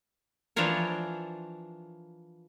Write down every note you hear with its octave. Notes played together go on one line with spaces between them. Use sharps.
E3 F3 D4 F4 A#4 C#5